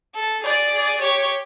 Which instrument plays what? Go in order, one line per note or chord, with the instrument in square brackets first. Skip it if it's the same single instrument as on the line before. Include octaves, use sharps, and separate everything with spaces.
[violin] A4
[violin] G#4 [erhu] D5
[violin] G#4
[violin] G4 [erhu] C#5